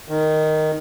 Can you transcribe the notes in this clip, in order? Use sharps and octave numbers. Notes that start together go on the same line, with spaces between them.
D#3